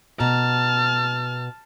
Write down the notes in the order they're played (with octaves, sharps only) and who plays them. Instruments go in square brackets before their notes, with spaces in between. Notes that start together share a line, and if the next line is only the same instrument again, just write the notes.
[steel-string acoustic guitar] B2 A#5 [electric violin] A5 F6